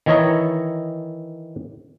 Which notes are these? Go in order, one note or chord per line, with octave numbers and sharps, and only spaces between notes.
D#3 E3 E4 C#5 D#5 A#5